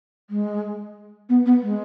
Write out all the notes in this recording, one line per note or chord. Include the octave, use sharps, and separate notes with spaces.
G#3
B3
B3
G#3